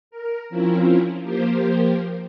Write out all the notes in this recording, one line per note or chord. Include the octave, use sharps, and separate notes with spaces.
A#4
F3 C4 C#4 E4 F4 A#4
F3 A#3 G4 A#4 C5